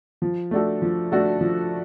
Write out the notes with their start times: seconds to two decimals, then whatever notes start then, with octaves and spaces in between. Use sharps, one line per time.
0.22 F3
0.51 A3 D4 F#4 A4
0.82 F3
1.12 A3 D4 F#4 A4
1.41 F3